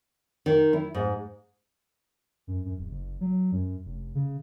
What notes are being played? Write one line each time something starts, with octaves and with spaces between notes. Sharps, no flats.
D#3
E4
G#2
F#2
F#2
D1
F#1
F#3
F#2
F1
C#3